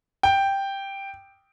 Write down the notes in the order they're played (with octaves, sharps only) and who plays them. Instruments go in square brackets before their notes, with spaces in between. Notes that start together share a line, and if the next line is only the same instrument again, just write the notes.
[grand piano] G5